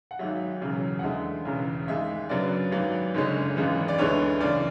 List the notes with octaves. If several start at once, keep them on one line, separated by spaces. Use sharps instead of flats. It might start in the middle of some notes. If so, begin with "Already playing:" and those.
F#5
G#1 G#2 F#3 E5
E1 E2 C#3 F#3
F#5
E2 D3 G#3 E5
E1 E2 C#3
G#1 G#2 G#3 E5
F#2 C#3 F#3 B3 D4 D5
G#1 G#2 F#3 B3
F#1 F#2 D3 G#3 C#4
G#1 F#2 E3 G#3 B3
D5
D2 D3 G#3 B3 E4 C#5
F#2 C#3 E3 D5